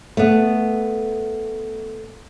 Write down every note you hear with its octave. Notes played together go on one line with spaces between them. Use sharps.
A3 B3